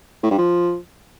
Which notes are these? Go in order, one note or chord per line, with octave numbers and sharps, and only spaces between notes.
A2
G2
F3